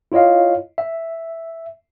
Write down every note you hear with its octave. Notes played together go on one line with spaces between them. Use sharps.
E4 F4 C#5 D#5 F5
E5